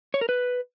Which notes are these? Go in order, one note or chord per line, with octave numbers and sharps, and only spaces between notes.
C#5
A#4
B4